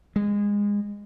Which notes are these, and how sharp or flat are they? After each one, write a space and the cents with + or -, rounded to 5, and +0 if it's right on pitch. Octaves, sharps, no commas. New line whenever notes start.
G#3 -25